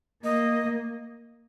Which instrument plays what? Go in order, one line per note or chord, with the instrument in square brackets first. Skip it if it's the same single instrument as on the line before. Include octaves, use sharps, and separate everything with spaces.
[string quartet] A#3 [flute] D#5